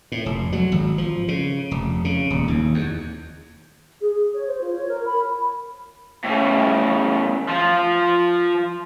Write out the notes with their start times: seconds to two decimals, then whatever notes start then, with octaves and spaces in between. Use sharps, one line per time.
0.12 A2
0.26 F1
0.52 F#3
0.72 G#1
0.98 F3
1.28 C#3
1.71 F1
2.05 C#3
2.30 D#1
2.48 D#2
2.74 E2
4.01 G#4
4.16 G#4
4.34 C#5
4.47 C5
4.61 F4
4.74 C#5
4.89 A#4
5.06 B5
6.24 A2 C#3
7.49 F3 F4